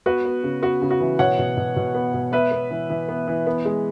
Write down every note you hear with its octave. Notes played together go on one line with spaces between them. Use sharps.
B3 F#4 B4
B3
C#3
B3 F#4
C#3
F#4
E3
B2 C#5 F#5
B2
B2
B2
B3
B2
B3 B4 E5
B3
E3
E3
B3
E3
B3
G#3